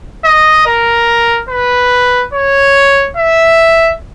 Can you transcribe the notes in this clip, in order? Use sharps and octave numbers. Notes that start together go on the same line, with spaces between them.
D#5
A#4
B4
C#5
E5